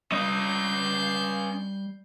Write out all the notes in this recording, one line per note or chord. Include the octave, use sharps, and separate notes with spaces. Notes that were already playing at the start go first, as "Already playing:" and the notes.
G3 C#4 D#5 G6 C7